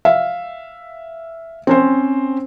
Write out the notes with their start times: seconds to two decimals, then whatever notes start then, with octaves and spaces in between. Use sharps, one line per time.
0.05 E5 F5
1.67 C4 C#4 C5